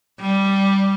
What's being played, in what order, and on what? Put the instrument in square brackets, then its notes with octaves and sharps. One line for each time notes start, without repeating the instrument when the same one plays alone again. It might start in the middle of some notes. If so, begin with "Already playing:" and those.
[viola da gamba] G3